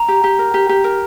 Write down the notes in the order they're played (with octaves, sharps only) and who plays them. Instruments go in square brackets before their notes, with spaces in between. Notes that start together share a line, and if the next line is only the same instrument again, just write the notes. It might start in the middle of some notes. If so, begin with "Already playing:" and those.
Already playing: [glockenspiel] A#5
[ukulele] G4
G4
A#4
G4
G4
A#4